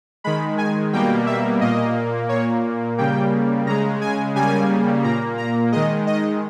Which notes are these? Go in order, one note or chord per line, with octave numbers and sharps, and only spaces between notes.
D#3 G#3 B5
G#5
B2 G3 A#3 G5
E5
A#2 A#3 D#5
A#2 A#3 C#5
C#3 G3 A#3 G5
C#3 G#3 A#5
G#5
C#3 G3 A#3 G#5
A#2 A#3 A#5
A#5
D#3 G#3 D#5
D#5